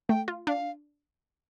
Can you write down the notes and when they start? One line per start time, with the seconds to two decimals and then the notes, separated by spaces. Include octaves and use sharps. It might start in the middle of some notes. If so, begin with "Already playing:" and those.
0.09 A3 G5
0.28 F4
0.47 D4 F5